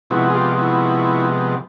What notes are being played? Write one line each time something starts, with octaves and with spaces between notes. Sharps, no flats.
C3 F3 G#3 B3 E4 F#4
G#4
F4 G4
E4 F#4